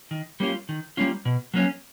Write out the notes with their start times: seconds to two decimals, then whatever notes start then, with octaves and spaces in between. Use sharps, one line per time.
0.11 D#3
0.40 G3 A#3 C#4 F4
0.69 D#3
0.97 G3 A#3 C#4 F4
1.25 B2
1.54 F#3 A#3 C#4